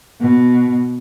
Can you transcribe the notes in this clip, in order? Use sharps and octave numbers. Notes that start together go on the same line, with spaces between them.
B2